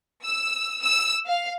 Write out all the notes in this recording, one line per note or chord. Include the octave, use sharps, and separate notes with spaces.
E6
E6
F5